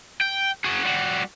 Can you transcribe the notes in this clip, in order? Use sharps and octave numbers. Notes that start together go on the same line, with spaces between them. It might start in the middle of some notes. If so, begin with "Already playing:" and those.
G5
F#4 G#4
G3 F#4